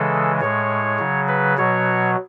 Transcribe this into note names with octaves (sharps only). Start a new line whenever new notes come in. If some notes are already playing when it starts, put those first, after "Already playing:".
Already playing: C#3 E3 G#3 A4
A2 G#3 C#5
C#3 F#3
B4
B2 F#3 C#5